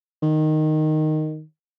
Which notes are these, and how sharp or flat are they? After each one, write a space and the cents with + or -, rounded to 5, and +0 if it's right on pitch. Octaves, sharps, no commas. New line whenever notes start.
D#3 -10